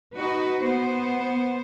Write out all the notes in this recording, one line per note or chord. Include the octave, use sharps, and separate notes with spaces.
D#4 F#4 B4
B3 C5